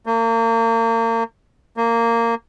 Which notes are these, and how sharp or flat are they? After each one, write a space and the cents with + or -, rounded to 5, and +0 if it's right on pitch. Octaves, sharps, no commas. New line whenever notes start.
A#3 -35
A#3 -15